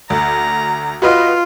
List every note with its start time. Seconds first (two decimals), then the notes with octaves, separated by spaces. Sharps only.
0.10 D2 A#5
1.02 F4 F#4 B4 D#5